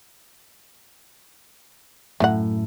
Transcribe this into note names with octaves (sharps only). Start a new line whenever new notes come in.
F#2 A2 A3 F#5